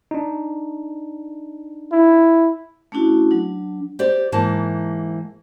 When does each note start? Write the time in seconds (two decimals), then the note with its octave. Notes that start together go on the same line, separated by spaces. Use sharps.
0.11 D4 D#4
1.92 E4
2.92 A3 C#4 D4 E4 F#4
3.31 F#3 D4
3.99 G4 C5 D5
4.32 G#2 E3 A#3 A5